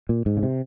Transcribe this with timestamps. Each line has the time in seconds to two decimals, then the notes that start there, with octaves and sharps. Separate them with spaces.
0.09 A#2
0.26 G#2
0.37 C#3
0.43 C3